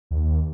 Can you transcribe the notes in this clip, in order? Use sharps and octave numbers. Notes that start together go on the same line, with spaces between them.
D#2